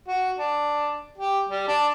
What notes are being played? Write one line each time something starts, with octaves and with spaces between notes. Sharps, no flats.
F#4
D4
G4
G3
D4